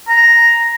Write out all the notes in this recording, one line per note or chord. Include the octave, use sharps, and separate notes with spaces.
A#5